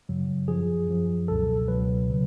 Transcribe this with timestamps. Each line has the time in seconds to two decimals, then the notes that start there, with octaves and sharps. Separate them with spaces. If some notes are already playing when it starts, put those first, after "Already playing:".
0.09 F#2 C#3 F#3
0.48 F#2 F3 G#4
0.88 F#2 F3
1.28 C#2 B2 F#3 A4
1.68 C#2 B2 F#3 B4
2.09 C#3 F#3